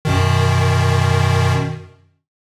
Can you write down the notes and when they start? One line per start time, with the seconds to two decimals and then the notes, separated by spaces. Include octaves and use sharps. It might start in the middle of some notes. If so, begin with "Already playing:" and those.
0.05 F#2 B2 D#3